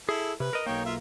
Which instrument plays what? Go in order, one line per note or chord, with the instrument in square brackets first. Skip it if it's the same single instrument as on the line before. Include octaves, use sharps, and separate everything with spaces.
[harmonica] E4 A4 [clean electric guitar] G#4
[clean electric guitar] C3 [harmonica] B4
[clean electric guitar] A#4 D#5
[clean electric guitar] B1 A#3 [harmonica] D#4 C#5 G5
[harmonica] F4 E5